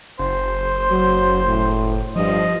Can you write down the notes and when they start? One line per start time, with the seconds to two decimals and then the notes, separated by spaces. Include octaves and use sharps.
0.19 F#1 C5
0.91 F#3
1.47 A2
2.16 G2 F3 D#5